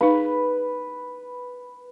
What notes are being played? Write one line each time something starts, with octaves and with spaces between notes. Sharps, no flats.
D#4 B4 F5